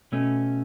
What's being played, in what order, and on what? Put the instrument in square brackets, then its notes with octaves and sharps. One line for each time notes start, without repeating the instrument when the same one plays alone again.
[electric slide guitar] B2 A3 C#4